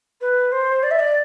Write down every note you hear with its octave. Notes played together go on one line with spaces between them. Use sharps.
B4
C5
D5
E5
D5